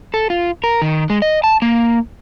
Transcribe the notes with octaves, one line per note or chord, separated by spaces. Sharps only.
A4
F4
A#4
D#3
G#3
D#5
A5
A#3